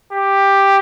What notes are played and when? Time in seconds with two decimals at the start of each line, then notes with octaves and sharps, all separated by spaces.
0.13 G4